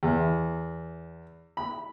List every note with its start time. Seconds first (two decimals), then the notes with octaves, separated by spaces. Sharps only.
0.03 E2
1.57 B5